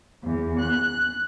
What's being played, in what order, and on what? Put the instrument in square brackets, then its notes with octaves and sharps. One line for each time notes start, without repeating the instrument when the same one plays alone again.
[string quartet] E2
F#6